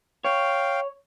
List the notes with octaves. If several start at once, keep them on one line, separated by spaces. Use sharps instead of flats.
C#5 F5 G5